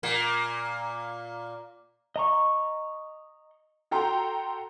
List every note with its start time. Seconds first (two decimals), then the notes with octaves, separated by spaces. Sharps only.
0.03 A#2 A#3
2.16 D#5 A#5 C#6
3.91 F#4 A4 G5 A#5 C6